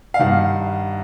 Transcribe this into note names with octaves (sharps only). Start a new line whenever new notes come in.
F5
G2 D#3 F#5